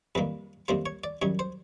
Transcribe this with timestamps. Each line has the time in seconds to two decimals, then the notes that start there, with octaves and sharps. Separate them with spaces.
0.15 F2 C3 D#3 G3 A#3 B4
0.68 F2 C3 D#3 G3 A#3 C5
0.86 C#5
1.04 D5
1.22 F#2 D#3 G3 C#5
1.39 C5